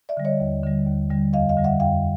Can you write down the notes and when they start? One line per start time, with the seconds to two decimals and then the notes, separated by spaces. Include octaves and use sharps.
0.09 D5 E5
0.17 D3 G3
0.25 C#5 D#5
0.40 D#2
0.63 D3 G3
0.87 D#2
1.10 D3 G3
1.33 F2 D#5 F5
1.49 D#5 F5
1.57 D3 G3
1.64 E5 F#5
1.80 F2 F5 G5